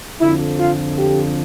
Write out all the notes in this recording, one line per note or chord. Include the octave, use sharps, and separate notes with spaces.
F2 D3 F3 E4
F4
G4